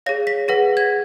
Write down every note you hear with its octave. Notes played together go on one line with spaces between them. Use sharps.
G#4 C#5 F5 A#6
B6
G#4 B4 F#5 A#6
G#6